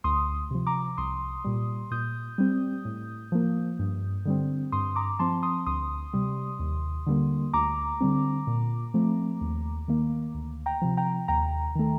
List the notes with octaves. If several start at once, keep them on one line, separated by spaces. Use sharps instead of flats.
D2 C6 D#6
C3 F3
A#5 D6
C2 C6 D#6
A#2 G3
A#2 D#6 G6
G3 C4
A2
F3 A#3
G2
D3 G3 C4
G2 C6 D#6
A#5 D6
F3 C4 A5 C6
C6 D#6
D2 C6 D#6
C3 G3
D#2
D3 G3 A#3
D2 A#5 D6
D3 G3 C4
A#2
F3 A3 C4
D#2
D#3 A#3
D2
G5 A#5
C3 F3
G5 A#5
D#2 G5 A#5
D#3 A3